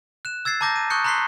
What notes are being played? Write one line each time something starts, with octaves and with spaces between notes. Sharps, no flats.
F#6 E7
E6 G#6 A6 C7
A5 A#5 D6 G6 A#6
D#7
C#6 D#6 F#6 G6 C#7
A#5 C6 F#6 B6 C7 G7